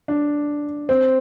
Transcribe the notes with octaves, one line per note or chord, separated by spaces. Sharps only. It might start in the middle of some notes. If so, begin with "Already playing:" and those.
D4
C4